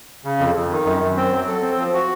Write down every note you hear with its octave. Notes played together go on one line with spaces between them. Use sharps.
C#3
F2
F2
D#3
F#2
F#2
C4
F#3
A4
C4
F3
F#4